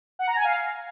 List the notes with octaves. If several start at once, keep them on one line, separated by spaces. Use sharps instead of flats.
F#5
A#5
G#5
F5